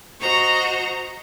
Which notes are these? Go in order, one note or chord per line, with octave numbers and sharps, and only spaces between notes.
F#4 C5 D#5 A#5 C#6